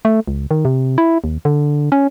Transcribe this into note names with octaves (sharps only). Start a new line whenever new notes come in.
A3
C#2
D#3
C3
E4
D#2
D3
C#4